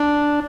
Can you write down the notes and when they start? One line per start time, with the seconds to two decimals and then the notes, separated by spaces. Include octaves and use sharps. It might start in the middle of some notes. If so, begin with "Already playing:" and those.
Already playing: D4